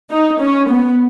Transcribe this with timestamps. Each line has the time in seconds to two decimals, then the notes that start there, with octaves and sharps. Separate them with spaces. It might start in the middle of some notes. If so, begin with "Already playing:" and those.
0.10 D#4
0.40 C#4
0.69 B3